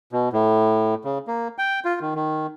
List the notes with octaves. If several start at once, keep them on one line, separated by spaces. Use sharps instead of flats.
B2
A2
C#3
A#3
G5
F4
D#3
D#3